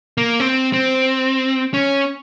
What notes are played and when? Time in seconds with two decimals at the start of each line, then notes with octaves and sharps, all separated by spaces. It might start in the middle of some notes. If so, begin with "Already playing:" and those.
0.18 A#3
0.40 C4
0.73 C4
1.74 C#4